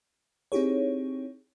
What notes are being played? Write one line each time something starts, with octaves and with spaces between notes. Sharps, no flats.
C4 D#4 E4 G4 G#4 C#5